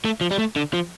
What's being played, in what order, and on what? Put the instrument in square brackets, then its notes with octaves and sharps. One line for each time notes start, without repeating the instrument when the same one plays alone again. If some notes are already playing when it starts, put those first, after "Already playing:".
[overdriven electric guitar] A3
F3
G3
A3
D3
F3